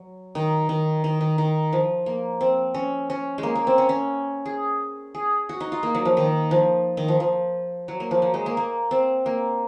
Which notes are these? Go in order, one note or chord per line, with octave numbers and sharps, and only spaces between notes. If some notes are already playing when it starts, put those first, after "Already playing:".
Already playing: F#3
D#3
D#3
D#3
D#3
D#3
F3
A#3
C4
C#4
C#4
G#3
A#3
A#3
C4
C#4
C#4
G#4
G#4
F#4
D#4
F4
A#3
F#3
F3
D#3
F3
D#3
F3
F3
F#3
A#3
F3
F#3
G#3
A#3
A#3
C4
A#3